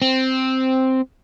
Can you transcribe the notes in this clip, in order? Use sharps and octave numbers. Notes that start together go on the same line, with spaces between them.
C4